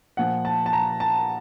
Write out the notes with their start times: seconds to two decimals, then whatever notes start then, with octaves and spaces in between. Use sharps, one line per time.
0.17 A#2 F3 F#5
0.45 A5
0.66 A5
0.73 A#5
1.00 A5